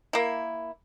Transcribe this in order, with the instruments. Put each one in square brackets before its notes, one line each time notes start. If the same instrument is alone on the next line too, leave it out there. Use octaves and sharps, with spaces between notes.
[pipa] A#3 E4